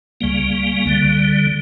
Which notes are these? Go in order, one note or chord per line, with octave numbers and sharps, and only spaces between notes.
C#2 C#3 G3 A#3
D3 G3